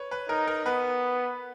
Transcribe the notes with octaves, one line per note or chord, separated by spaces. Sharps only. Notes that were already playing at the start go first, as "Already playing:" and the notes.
Already playing: B4 C#5
B4
D#4 A#4
A#4
B3 B4